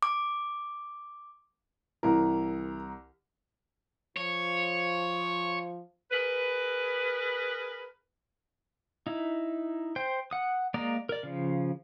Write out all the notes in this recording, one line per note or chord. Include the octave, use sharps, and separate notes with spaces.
D6
C2 E3 A#4
F3 C#5
G#4 A#4 B4
D#4 E4
C5 G5
F#5 D#6
G#3 A#3 D5 A#5 D#6
A#4 D5
C#3 F3